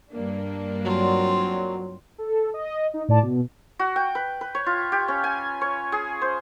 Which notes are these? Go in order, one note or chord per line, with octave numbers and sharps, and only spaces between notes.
G2 A#3 D4
F#3 C4 F4
A4
D#5
D#4
A2 D5 A5
B2
F#4
G5
B4
B4
C#5
F4
G4
C#4
G#5
C#5
G#4
C5